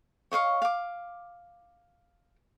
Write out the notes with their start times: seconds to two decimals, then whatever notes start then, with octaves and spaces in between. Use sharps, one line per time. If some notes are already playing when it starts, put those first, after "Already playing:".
0.32 C#5 D#5 F5 C#6
0.62 F5 D6